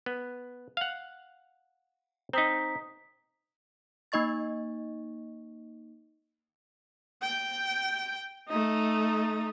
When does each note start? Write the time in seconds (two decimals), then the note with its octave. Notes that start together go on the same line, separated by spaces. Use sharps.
0.06 B3
0.77 F5 F#5
2.33 C4 D#4 A#5 D#6 B6
4.12 A#3 D#4 D#5 C#6 A6
7.22 G5
8.49 A3 D#4